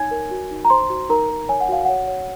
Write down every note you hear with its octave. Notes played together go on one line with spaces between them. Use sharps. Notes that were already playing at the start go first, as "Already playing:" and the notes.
Already playing: D#4 C#5 G#5 G#6
A#4
F#4
D#4
A#5
C5 C6
F#4
D#4 A#4 A#5
A#4
C#5 G#5
F#5
F#4 F5
C#5 F#5
C#5